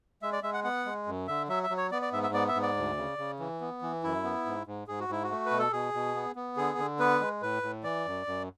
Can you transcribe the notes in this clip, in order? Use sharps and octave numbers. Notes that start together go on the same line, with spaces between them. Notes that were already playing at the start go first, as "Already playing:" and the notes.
G#3 E5
D5
G#3 E5
F#5
B3 F#5
G#3
F#2
D3 E5
F#3 E5
E5
F#3
C#5
B3 D5
D5
G#2 E5
E5
B3 D5
E5
G#2
D5
D2
C#3
C#3
E3
B3
E3
F#2 E4
B3
G#2
G#2
G#2 G#4
F#4
G#2 E4
F#4
A3
B4
B2
A4
B2 G#4
B2
B3
B3
D3 G#4
D3
B3 B4
G#3
A2 B4
A2
E3 D5
F#2
F#2